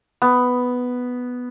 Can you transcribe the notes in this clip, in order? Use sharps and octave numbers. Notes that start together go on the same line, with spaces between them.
B3